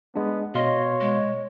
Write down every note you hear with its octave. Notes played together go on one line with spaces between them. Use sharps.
G#3 B3 D4
B2 C#5 D#5 F5 C6
G#3